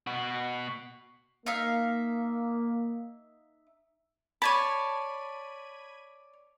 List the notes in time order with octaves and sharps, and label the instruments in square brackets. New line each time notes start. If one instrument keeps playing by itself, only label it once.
[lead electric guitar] B2 F#4
[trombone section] A#3 [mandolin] D#4 E5 F5
[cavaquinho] C#5 D5 A5 [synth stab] B5 G#6 D#7